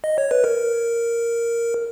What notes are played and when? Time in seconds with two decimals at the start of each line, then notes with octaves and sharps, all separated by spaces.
0.04 D#5
0.18 C#5
0.31 B4
0.44 A#4